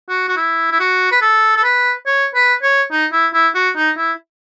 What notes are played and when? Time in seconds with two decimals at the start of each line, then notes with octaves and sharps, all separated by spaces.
0.09 F#4
0.28 F#4
0.37 E4
0.71 E4
0.79 F#4
1.12 B4
1.22 A4
1.56 A4
1.63 B4
2.06 C#5
2.34 B4
2.62 C#5
2.91 D#4
3.12 E4
3.33 E4
3.55 F#4
3.76 D#4
3.97 E4